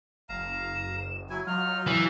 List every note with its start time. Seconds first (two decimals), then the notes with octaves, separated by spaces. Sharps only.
0.29 F#1 F5 A#5 E7
1.30 F#3 E4 G#5
1.47 F#3 D#4 F4 F6
1.87 E3 E6